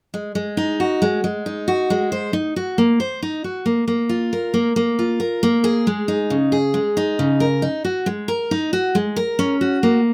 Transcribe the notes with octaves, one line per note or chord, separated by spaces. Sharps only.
G#3
G#3
D#4
F#4
G#3
G#3
D#4
F#4
G#3
C5
D#4
F#4
A#3
C5
D#4
F#4
A#3
A#3
F4
A#4
A#3
A#3
F4
A#4
A#3
G#4
G#3
D#4
C#3
G#4
G#3
D#4
C#3
A#4
D#4
F#4
G#3
A#4
D#4
F#4
G#3
A#4
C#4
F#4
A#3